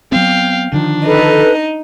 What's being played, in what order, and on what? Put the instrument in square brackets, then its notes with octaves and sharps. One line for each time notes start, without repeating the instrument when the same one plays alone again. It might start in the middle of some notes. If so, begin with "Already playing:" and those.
[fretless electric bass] F#3 B3 C4 [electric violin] F5 G5
[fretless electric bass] D3 D#3 F3 [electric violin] D4
[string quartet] D#4 [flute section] A4 B4